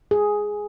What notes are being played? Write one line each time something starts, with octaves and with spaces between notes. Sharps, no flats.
G#4